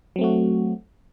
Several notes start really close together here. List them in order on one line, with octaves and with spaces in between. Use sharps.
F#3 C4 A3 F#4